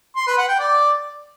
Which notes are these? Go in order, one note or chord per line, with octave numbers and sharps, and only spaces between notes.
C6
B4
F#5
G5
D5